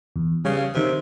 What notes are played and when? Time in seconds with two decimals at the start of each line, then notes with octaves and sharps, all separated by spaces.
0.16 E2
0.45 C#3 G3 C#5 F5
0.75 C3 D#3 G4